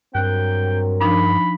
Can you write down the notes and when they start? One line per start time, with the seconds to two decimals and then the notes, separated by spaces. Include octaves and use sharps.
0.15 G2 F#3 C4 A#4 G5 F#6
1.01 F3 D4 D#4 B5